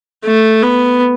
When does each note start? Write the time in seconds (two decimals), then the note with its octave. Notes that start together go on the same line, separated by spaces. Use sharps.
0.25 A3
0.62 B3